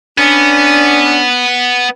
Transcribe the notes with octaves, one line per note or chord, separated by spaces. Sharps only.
B3 C#4 D4